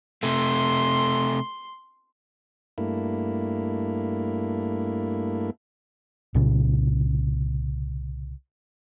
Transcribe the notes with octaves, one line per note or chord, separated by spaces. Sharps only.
C3 A3 C6
G2 A3 A#3 E4
C2 A#2 C#3